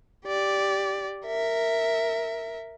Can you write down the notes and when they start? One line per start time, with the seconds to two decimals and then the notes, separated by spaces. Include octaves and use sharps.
0.25 G4 D5
1.26 A#4 E5